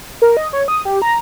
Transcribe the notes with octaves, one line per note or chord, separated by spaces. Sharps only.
A#4
D#5
C#5
D#6
G4
A#5